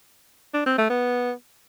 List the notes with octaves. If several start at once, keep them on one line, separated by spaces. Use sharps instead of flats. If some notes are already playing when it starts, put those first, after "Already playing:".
D4
C4
A3
B3